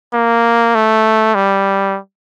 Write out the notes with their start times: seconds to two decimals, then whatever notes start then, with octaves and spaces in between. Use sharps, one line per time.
0.13 A#3
0.75 A3
1.35 G3